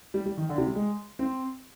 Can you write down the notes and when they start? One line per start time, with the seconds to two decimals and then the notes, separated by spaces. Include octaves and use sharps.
0.14 G3
0.25 G3
0.37 D#3
0.49 D3
0.58 C3
0.67 G3
0.75 G#3
1.19 C4